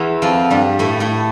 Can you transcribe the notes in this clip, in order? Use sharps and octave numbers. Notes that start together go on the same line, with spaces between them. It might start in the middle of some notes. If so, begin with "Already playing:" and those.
Already playing: E2 E3
F2 F3
G2 G3
A2 A3
A2 A3